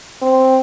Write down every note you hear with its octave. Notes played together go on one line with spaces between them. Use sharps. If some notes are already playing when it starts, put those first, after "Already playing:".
C4